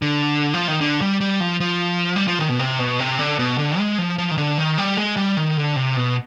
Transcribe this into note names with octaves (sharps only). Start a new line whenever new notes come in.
D3
F3
D#3
D3
G3
G3
F3
F3
G3
F3
D#3
B2
C3
B2
C3
D3
B2
D3
G#3
F3
F3
D#3
D3
D#3
G3
G#3
G3
D#3
D3
C3
B2